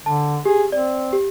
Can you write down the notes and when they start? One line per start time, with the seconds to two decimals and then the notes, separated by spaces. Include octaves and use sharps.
0.06 D3 A5
0.45 G4 G#4
0.72 C4 D5
1.13 G4